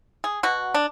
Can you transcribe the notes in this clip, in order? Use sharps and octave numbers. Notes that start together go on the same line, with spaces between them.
G#4
B2 F#4
D4